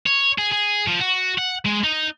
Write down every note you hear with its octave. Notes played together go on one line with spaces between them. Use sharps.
C#5
G#4
G#4
F3
F#4
F#5
G#3
D#4